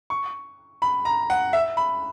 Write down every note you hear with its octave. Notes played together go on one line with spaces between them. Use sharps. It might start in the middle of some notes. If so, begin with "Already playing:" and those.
C#6
B5
A#5
F#5
E5
B5